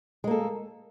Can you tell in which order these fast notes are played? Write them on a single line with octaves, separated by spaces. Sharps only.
G#3 A#3 A4